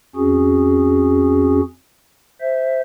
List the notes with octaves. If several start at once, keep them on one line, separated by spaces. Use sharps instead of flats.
F2 C#4 F#4 G#4
C5 E5